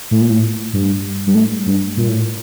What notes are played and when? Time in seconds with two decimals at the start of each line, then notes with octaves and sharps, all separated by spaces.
0.11 A2
0.21 A#2
0.30 A2
0.73 G2
1.26 G2
1.35 A2
1.66 G2
1.97 A#2
2.09 A2